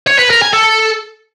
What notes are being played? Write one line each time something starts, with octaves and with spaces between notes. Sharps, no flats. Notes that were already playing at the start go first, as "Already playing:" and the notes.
C#5
B4
A#4
G#5
A4